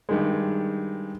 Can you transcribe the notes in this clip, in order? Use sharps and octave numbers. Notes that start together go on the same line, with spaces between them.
G2 D#3 G#3